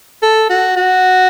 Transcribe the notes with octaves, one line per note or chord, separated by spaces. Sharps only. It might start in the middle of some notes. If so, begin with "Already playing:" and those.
A4
F#4
F#4